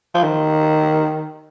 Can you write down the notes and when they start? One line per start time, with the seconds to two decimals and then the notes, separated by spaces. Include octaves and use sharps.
0.14 F3
0.23 D#3